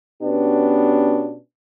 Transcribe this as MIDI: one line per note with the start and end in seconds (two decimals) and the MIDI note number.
0.23 1.36 47
0.23 1.36 59
0.23 1.36 61
0.23 1.36 62
0.23 1.36 67